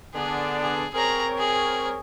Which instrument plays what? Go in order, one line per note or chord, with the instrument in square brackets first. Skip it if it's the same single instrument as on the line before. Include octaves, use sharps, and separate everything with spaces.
[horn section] D3 B3 D4 [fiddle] G#4
[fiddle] G#4
[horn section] C4 A#4 C#5 [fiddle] G#4 A#5
[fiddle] G#4